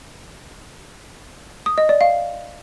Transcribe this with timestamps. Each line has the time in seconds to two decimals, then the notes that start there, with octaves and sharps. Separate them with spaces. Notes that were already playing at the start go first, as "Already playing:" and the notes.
1.66 D#6
1.78 D#5
1.89 D5
2.01 F5